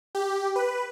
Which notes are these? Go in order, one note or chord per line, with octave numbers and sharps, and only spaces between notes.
G4
B4